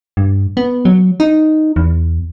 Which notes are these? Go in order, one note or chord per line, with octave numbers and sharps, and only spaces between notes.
G2
B3
F#3
D#4
E2